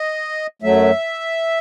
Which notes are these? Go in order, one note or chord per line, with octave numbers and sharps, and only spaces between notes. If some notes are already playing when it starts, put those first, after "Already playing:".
Already playing: D#5
F#2 F#3 A3 E5